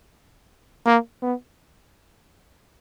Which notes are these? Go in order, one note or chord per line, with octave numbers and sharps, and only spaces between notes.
A#3
B3